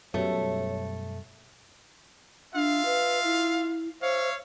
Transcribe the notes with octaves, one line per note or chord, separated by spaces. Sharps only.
F#2 B2 G3 A3 C#5
D4 F4 E5 F5
B4
E4
C5 C#5 E5 F5